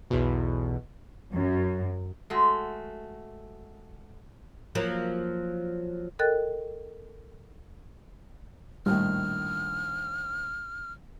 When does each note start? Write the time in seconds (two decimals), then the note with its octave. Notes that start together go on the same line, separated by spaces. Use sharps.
0.10 B1 E2 B2
1.32 F#2
2.30 G#3 A3 F#4
4.75 F3 F#3 A#3
6.19 A4 A#4 D#5 G5 F#6 A6
8.86 A#1 A2 D#3 G3 F6